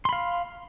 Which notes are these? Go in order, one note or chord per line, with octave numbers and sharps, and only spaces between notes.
F5 B5 C6